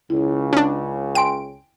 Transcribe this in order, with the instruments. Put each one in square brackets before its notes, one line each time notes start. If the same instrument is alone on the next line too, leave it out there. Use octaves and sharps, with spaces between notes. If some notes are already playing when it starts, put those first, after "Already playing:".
[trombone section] C#2 C#3 [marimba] E4
[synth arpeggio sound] C#4 D4
[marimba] G5 G#5 C6 [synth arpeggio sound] D7